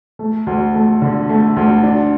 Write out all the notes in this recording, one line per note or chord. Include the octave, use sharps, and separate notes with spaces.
A3
D2
A3
D3
A3
D2
D4